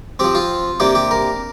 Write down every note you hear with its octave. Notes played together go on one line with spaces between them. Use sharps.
F3 C4 G4
F4
C3 A#3 D4 G4
G4
A#4